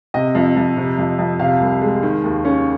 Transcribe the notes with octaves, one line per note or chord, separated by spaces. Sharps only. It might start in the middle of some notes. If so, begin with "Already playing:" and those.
C3 D#5
F2
F2
C3
F2
F2
C3 F5
C2
G#3
D#3
D#2
C#4